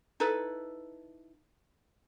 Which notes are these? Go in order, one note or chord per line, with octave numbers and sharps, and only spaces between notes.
D#4 E4 A4 B4